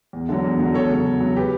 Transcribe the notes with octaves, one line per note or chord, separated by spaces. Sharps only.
E2
D3 F#3
E2
D3 F#3
E2 A4 C#5
C#3 F#3
E2
C#3 F#3
G4 B4